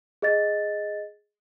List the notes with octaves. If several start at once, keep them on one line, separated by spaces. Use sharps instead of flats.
G#4 D#5 A6